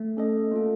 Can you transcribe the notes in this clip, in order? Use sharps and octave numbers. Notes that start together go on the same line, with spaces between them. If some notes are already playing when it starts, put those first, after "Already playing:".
Already playing: A3
C#4 A4 D#5
A#3 F4 A4